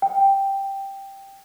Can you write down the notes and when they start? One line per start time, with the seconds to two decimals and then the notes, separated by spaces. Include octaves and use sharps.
0.02 G5